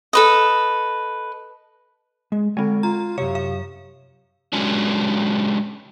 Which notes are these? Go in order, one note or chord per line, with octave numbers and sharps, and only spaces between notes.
A4 B4 D#5
G#3
D3 G#3 C4 G#5
F4 A#5
F#2 C3 C#5 F5
F5
F#3 G#3 C#4 D4